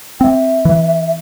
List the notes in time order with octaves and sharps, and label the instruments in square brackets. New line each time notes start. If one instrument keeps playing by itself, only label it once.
[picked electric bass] C4 [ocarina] E5 G5
[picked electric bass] E3